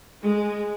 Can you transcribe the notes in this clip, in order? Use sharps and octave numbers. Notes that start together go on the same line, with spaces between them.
G#3